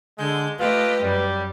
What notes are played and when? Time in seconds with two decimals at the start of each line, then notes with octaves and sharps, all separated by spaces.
0.19 D3 G#3 G6
0.59 A3 F4 G4 B4 D#5
1.02 F#2 G3